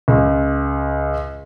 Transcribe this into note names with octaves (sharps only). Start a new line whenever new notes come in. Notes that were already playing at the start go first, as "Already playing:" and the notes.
C#2